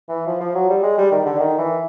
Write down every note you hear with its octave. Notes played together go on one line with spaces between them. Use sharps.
E3
F3
F3
F#3
G3
G#3
G3
D#3
D3
D#3
E3